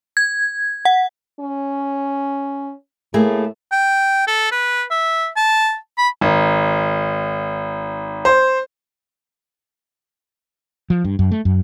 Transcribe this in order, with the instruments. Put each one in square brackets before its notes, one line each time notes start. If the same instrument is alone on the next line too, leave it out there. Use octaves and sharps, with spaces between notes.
[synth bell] G#6
F#5
[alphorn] C#4
[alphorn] A2 [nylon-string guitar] A3 A#3 G#4
[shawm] G5
A4
B4
E5
A5
B5
[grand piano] G#1
C5
[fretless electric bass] F3
G2
F#2
A3
F#2